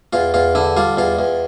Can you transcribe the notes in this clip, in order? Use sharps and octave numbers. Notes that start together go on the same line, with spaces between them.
E2 F4
E2 F4
D3 E4
G3 F4
E2 F4
E2